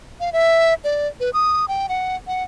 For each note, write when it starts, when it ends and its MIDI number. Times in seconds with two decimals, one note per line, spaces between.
0.20 0.30 77
0.33 0.74 76
0.84 1.07 74
1.20 1.30 71
1.34 1.65 87
1.68 1.86 79
1.89 2.16 78
2.27 2.43 78